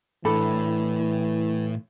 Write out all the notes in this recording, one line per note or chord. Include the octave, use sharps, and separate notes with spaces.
A2 E3 D4 A4 B5